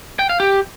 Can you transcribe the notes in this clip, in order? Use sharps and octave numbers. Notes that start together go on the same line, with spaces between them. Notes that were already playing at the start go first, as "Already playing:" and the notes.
G5
F5
G4